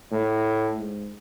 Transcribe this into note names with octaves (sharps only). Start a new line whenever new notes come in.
A2
G#2